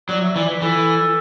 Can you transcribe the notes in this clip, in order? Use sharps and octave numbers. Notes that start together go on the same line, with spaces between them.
F#3 D5
E5
E3 D5
B4
E3 A4